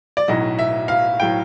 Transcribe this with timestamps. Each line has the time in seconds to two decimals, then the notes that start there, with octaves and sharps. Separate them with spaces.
0.17 D5
0.28 B1 A2 F#3 D#5
0.59 E5
0.88 F5
1.20 A2 F#3 G5